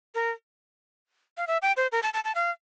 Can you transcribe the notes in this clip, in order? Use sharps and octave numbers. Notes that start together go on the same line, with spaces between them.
A#4
F5
E5
G5
C5
A#4
A5
A5
A5
F5